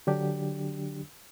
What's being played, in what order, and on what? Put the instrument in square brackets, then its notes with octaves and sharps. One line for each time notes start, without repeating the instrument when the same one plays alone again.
[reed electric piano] D3 F#3 D4 G4